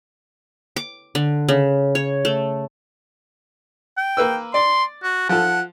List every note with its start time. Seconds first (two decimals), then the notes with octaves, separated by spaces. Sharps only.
0.76 D6
1.15 D3
1.49 C#3
1.95 C#5
2.25 A3
3.97 G5
4.17 A#3 B4 E6
4.54 D5 C6
5.03 F#4
5.29 F3 A4 F#5